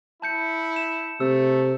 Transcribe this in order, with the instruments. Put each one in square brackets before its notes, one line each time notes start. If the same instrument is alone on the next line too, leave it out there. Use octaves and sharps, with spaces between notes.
[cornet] E4 [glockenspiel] A5 G6 C#7
[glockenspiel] E7
[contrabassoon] C3 [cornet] A3 [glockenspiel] E6